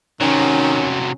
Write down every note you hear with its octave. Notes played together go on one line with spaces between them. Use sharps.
C3 D#3 F#3 C#4